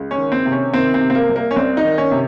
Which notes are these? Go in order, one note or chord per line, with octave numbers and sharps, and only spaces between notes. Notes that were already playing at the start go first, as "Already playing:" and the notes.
Already playing: C#2
C#4
D#3
C4
C3
C#4
D#3 C4
C4
C3
C4
A#3
C2
A#3
C#4
C2 C4
D#4
D#3
C#4
C3